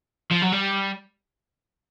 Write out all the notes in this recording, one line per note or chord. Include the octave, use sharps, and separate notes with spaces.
F3
F#3
G3